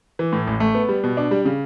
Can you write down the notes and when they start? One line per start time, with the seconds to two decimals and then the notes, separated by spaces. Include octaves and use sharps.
0.19 E3
0.33 A2
0.47 A1
0.60 A3
0.75 B3
0.89 G3
1.04 B2
1.17 D4
1.31 G3
1.45 C#3